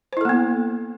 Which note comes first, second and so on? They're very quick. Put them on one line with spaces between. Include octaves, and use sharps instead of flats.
C5 E4 A4 A#3 B3